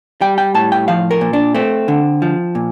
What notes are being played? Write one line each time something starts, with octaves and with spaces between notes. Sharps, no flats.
G3 G5
G5
A2 A5
G5
F3 F5
A#4
A#2
D4
A3 C4
D3
F3
A#2